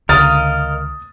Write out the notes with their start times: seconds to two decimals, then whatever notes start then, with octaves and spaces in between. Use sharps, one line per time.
0.09 C#2 D3 A#4 D#5 F5 D#6 F6 A6